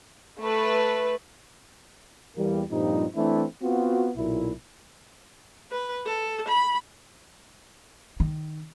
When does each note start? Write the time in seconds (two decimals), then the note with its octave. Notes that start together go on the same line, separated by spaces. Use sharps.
0.40 A3 B4
2.37 E2 G3 A#3
2.70 G2 A#2 F3 G3 C4 D#4
3.16 E3 A3 C4 D4 E4
3.62 B3 C4 F4 F#4
4.17 B1 A#2 E4
5.71 B4
6.06 A4
6.49 B5
8.20 D#3